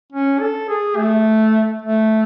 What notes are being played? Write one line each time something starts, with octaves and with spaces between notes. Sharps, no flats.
C#4
A4
G#4
A3
A3